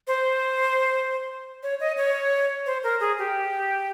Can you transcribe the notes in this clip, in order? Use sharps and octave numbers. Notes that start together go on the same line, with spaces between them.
C5
C#5
D#5
C#5
C5
A#4
G#4
G4